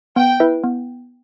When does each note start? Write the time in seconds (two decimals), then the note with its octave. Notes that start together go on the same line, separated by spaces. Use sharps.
0.16 B3 G5
0.40 E4 B4 E5
0.64 B3